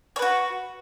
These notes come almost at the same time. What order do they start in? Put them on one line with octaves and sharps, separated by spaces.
C#5 B4 F#4